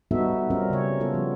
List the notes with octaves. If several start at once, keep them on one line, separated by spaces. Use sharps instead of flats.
G3 B3 D#4 F#4 A4 E5
G3 C4 C#4 F4 A#4
C#3 C#5
G3 B3 F4 A4
F3